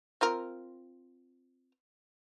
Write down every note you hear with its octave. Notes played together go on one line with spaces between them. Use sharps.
C4 F4 A#4